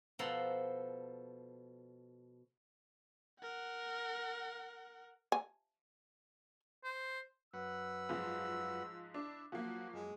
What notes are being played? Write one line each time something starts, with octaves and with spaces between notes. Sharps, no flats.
B2 F3 A4 F#5 A#5 C6
A#4 F#5
G#5
C5
F#2 B4 F#5 E6
G#2 F3
D4 E4
F3 F#3 A#3 F#4
F#2 G#3